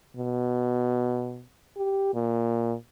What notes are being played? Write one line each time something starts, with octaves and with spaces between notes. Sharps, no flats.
B2
G4
A#2